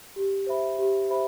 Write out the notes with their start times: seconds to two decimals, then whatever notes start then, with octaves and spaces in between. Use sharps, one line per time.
0.16 G4
0.47 C5 E5 B5
0.79 G4
1.10 C5 E5 B5